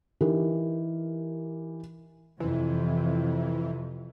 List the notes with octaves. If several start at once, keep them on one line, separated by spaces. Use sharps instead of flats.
E3 D#4 G4 A#4
F2 C3 E3